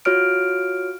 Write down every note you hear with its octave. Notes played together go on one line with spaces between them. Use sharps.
F4 F#4 C#5 F6 D7